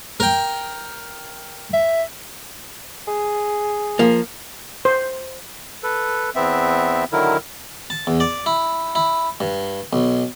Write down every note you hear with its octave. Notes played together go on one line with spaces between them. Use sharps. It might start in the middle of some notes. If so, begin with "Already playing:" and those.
A#4 G5
E5
G#4
F3 A#3
C5
A4 B4
E2 B3 C4 E5
D3 D#3 F#3 E4 A#4
A5
E2
D5
E4
E4
G2
B1